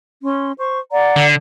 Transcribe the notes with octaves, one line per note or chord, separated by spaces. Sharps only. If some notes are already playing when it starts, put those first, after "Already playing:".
C#4 C6
C5 C#6
D5 F#5 A#5
D3